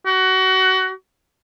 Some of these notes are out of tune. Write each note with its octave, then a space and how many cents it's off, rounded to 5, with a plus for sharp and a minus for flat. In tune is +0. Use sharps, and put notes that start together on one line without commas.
F#4 +25